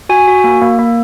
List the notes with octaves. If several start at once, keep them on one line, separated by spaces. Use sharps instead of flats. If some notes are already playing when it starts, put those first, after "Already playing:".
F#4 G#5
F#4
A#3
A#3
A#3